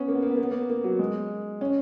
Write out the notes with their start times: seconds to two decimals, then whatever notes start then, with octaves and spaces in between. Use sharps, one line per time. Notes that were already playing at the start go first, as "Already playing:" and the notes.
Already playing: B3 C#4
0.08 A#3
0.15 B3
0.22 A#3
0.30 B3
0.37 A#3
0.43 B3
0.51 A#3
0.70 A#3
0.84 F#3
0.99 G#3
1.61 C#4